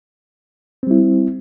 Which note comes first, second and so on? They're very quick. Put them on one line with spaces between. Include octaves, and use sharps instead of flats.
C4 G3 E4